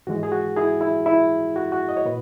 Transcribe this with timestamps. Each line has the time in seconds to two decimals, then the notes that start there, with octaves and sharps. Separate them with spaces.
0.07 G#2 E3 G#3 F#4
0.23 G#4
0.32 F#4
0.56 E4 G#4
0.81 E4
1.06 E4
1.56 F#4
1.72 F#4
1.89 D#5
1.97 C#5
2.05 A#2 B4